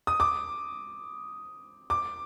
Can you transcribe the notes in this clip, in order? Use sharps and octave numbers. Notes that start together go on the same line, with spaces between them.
D#6
D6
D6